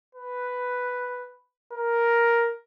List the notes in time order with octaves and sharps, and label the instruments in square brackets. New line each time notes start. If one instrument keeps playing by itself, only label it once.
[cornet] B4
A#4